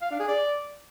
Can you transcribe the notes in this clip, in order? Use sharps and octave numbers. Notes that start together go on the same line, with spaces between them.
F5
D4
G#4
D5